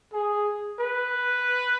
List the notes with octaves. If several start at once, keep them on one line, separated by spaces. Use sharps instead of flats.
G#4
B4